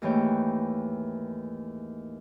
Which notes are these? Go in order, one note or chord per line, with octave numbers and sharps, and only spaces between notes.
D#2 G#2 E3 A3 C#5 G5